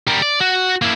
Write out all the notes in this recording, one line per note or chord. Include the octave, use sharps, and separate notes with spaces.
G3 A#4
D5
F#4
A#3 E4